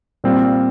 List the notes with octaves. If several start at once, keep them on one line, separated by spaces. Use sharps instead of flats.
A#2 G3 C4 F4